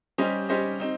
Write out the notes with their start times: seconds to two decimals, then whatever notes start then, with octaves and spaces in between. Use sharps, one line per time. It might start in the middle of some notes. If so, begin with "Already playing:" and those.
0.18 G3 C#4 G4 C5 D#5
0.49 G3 C#4 G4 C5 D#5
0.80 C4 D#4